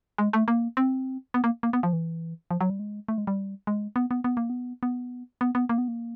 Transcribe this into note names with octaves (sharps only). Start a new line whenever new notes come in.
G#3
A3
A#3
C4
B3
A#3
A#3
B3
F3
E3
F3
F#3
G3
G#3
A3
G#3
G3
G#3
B3
B3
B3
A#3
B3
B3
B3
B3
A#3
B3
A#3